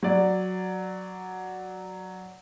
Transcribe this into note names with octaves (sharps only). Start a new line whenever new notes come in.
F#3 D5